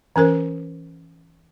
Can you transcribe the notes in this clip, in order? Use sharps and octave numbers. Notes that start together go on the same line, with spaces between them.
E3 C#4 A#4 C5